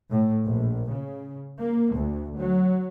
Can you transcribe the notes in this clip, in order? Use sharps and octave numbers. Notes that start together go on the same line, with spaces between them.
A2
A#1
C#3
A#3
D2
F#3